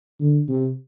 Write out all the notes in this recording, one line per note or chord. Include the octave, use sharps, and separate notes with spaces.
D3
C3